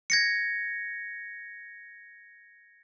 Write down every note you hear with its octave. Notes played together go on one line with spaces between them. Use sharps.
G#6 A#6 C#7